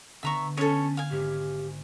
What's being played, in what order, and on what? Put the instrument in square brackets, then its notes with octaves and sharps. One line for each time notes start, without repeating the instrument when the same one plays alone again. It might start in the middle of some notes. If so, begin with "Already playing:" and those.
[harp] D3 B3 [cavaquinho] E5 A#5 C#6
[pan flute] C#4 [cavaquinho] A4 C#5
[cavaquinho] F5 G#5
[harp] G#1 [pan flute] G4